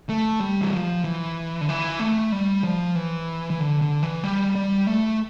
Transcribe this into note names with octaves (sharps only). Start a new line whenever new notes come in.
A3
G3
E3
F3
E3
D3
E3
A3
G3
F3
E3
E3
D3
D3
E3
G3
G3
A3